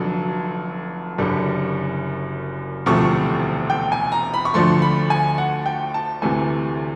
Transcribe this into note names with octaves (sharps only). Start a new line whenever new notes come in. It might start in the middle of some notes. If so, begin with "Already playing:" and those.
Already playing: F1 F2 D3 F#3
F#1 F#2 D3 G3
E1 D2 C3 F3 A3 C#6
G5
G#5
A#5
B5
C#6
D2 D3 F3 A3 C6
B5
G#5
F#5
G5
A5
D2 C3 E3 A3 G#5